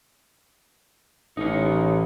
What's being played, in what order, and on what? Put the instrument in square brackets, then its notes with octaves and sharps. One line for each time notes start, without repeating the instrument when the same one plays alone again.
[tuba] A1 [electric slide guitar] D#4 C#5